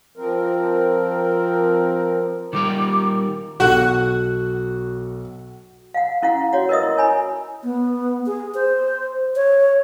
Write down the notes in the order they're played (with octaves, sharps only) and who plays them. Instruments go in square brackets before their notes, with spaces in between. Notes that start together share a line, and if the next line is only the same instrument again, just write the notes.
[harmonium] F3 C4 A#4
[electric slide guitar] D#3 G3 A#4 [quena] D6
[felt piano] B1 A4 F#6 [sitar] F#4
[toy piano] F5 F#5
C#4 E4 F5 F#5
F#4 C#5 F#5
A#4 B4 D#5 E5 D#6
E4
A#4 C#5 G#5 B5
[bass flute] B3
G#4
C5
C#5